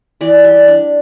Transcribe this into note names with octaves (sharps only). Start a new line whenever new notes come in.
E3 D5
G3
D4